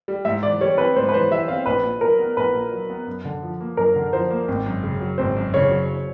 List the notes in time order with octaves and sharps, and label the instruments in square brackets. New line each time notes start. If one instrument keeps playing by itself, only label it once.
[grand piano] G3
[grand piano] G#2 [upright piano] E5
[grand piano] E3 [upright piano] D5
[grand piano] G3 [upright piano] C#5
[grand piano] C4 [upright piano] B4
[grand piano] G#2 [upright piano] C5
[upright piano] B4
[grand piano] E3 [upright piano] C5
[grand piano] G3 [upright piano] E5
[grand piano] C4 [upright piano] F5
[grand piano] A#1 [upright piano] B4
[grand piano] A#2
[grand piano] F#3 [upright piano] A#4
[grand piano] B3
[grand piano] A#1 [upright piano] B4
[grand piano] A#2
F#3
B3
F#2
D3
F3
A#3
[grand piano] F#2 [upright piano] A#4
[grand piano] D3
[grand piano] F3 [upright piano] C5
[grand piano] A#3
G#1
F#2
C#3
F#3
[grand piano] G#1 [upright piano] C5
[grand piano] F#2
[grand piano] C#3 [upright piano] C#5
[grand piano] F#3